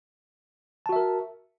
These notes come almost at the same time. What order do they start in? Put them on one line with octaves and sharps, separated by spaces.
A5 F#4 E5 A#4